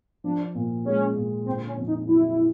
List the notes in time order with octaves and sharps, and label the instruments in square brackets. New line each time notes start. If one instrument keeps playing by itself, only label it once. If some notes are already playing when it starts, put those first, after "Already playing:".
[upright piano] F3 [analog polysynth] D4
[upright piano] A#2
[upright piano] G#3 [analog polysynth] C#4
[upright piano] A#2
[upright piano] D3 [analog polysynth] C4
[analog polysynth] C#4
[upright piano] F2
[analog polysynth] D#4
[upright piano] F#3 [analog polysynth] E4